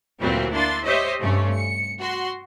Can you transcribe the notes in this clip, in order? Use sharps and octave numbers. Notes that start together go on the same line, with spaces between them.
D2 A#2 E3 F#3 G3 C4
A#3 D4 E4 C6 A6
G4 C5 C#5 D#5 E5
G2 C3 A3 C#4
C#7
F#4 C6